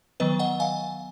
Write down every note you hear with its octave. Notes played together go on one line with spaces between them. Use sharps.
D#3 F#3 B3 B4 D#5
D#5 F#5
F5 G#5